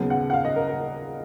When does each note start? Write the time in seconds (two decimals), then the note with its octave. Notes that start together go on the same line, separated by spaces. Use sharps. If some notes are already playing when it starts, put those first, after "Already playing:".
Already playing: D#2 C#3 F#3 B3
0.10 F#5
0.30 F#5
0.33 F5
0.45 D#5
0.56 A#4
0.68 A#4